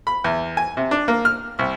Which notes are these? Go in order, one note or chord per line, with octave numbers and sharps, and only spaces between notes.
B5
E2
G#5
C3
D4
A#3
F6
C2